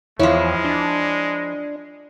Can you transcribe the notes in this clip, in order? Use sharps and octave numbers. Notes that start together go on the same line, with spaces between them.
E2 F3 G#3 E4 C#5
D4